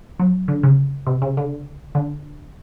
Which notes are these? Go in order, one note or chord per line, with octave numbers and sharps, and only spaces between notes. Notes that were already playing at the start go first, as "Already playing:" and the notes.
F#3
D3
C#3
C3
C#3
D3
D3